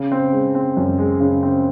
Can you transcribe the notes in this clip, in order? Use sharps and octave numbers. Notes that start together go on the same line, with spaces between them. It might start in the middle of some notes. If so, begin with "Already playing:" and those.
Already playing: C#3
C4
G#3
C4
F#2
G#3
C#3
C4